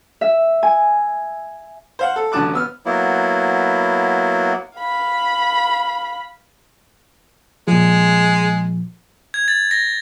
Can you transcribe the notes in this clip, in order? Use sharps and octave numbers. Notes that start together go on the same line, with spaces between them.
E5
G#5
C5 F5 F#5
A4
A1 D3 F#3 A5 D6 F#6
B3 E6 F6
F#3 A#3 B3 E4
F5 B5
A#2 F3 G#3
G#6
A6
A#6